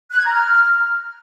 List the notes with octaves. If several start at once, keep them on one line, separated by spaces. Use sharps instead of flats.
F#6
G#6
A#5
F6